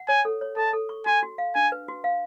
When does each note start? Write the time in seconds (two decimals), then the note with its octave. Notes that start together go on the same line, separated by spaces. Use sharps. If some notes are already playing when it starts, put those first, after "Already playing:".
Already playing: F#5
0.08 C#5 G#5
0.25 A4
0.41 C#5
0.56 A4 A5
0.73 A4
0.89 C#6
1.06 F#4 G#5
1.23 F#4
1.38 F5
1.55 D4 G#5
1.72 B4
1.88 F#4
2.04 F5